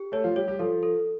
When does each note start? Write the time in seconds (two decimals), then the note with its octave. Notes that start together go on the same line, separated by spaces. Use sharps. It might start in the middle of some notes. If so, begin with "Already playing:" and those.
Already playing: G4
0.12 A3 A4 C#5
0.24 F3 F4
0.36 G3 G4 C#5
0.48 G3 G4
0.59 F3 F4 A4
0.83 A4